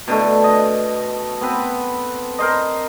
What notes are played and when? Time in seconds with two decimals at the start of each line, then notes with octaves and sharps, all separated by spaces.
0.08 B2 D3 A3
0.44 D#5
1.41 B3 C4 B4
2.39 A#4 C5 D#5